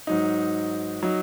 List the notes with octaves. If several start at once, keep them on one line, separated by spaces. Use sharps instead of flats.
G#2 F#3 D#4
F#3 D#4